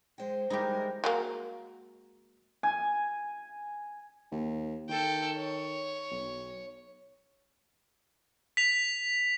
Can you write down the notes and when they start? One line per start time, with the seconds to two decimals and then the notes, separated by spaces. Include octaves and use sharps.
0.18 G#3 C5 G5
0.50 G3 G#3 D#4 E4 G4 A#4
1.04 F#3 G#3 A#3
2.63 G#5
4.32 D#2
4.89 D#3 A4 G5
5.37 C#5
6.11 B1
8.57 B6 F7